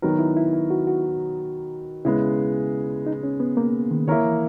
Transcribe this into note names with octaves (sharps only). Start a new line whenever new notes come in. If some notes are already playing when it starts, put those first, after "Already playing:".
D#3 F#3 B3 D#4 F#4 A#4
E4
E4
E4
F#4
F#4
C#3 G#3 B3 E4
D#4
C#4
B3
A#3
D#3
D#3 A#3 E4 A#4 C#5
E3